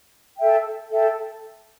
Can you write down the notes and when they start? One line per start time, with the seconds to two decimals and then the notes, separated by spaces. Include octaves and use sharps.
0.37 A4 E5 G5
0.89 A4 E5 G5